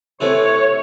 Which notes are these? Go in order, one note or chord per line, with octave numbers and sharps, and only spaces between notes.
C3 E3 A3 C#5